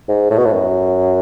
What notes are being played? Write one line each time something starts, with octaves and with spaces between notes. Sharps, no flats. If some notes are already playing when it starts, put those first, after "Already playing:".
G#2
A2
B2
A2
F#2